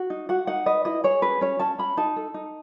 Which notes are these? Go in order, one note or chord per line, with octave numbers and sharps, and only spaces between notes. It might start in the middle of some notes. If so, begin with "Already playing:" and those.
Already playing: F#4
D#4
F#4 F#5
D#4 F#5
B4 D#5
E4 D#5
G#4 C#5
C#4 B4
C#4 C#5
C#4 A5
C#4 B5
D#4 A5
A4
D#4